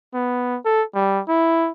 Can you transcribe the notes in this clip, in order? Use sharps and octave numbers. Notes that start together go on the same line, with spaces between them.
B3
A4
G3
E4